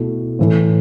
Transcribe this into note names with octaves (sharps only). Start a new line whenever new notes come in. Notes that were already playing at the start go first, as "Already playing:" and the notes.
Already playing: B2 A3 E4
A2 E3 A3